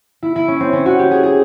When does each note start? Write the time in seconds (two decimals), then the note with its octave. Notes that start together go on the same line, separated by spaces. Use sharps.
0.23 E4
0.36 E4
0.48 C#4
0.60 C4
0.73 C#4
0.86 F#4
0.99 G4
1.11 G#4
1.23 G#4